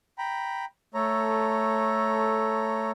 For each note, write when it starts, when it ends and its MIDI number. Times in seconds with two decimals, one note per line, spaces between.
0.18 0.65 79
0.18 0.65 82
0.18 0.65 83
0.94 2.91 57
0.94 2.91 69
0.94 2.91 73
0.94 2.91 82